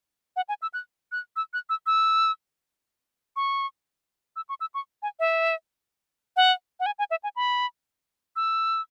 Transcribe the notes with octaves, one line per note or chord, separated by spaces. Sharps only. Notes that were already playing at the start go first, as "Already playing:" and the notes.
F#5
G#5
E6
F#6
F#6
E6
F#6
E6
E6
C#6
E6
C#6
E6
C#6
G#5
E5
F#5
F#5
G#5
G#5
E5
G#5
B5
E6